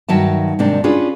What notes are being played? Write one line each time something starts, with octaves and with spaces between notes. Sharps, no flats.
G2 D#3 F#3 E5 A5
G#2 C3 D#3 D4
C#4 D4 F4 G#4 B4